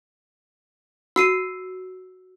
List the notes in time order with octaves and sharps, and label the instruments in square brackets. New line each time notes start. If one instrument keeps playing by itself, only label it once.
[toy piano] F#4 [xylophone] E6 C7 D#7